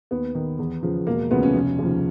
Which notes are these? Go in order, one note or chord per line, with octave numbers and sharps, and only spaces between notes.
D#2 B3
D#3
E2
C#3 F3
E1 A#3
D2 C#3 F3 B3
C#4
F1
D#2 C#3 F3